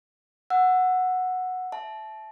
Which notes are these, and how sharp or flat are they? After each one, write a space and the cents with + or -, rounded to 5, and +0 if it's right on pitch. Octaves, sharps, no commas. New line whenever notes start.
F#5 -5 E6 +10
E5 +0 A5 -25